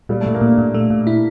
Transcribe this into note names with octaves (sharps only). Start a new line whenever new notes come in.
A#2 G3
A3
A#2
A#3
A#2 D4
A#2
A3
A#2
E4